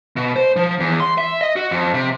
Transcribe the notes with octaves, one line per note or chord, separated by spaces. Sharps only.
B2
C5
F3
E2
C6
E5
D#5
F#4
F2
C3